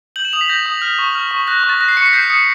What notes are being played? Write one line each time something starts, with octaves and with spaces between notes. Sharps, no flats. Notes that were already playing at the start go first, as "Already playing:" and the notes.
G6 F#7
E7
D#6 F7
B6
G6 A#6
D#6
F6
C#6
F6
C#6
F#6 A#6
C#6
A6
F#6 A#6
C7
C#6 C#7
B6
G6 C7
D#6 C#7